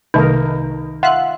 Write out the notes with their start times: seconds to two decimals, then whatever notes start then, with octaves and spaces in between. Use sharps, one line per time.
0.14 C2 D#3 A3 D#4 A#4
1.03 F4 E5 F#5 F#6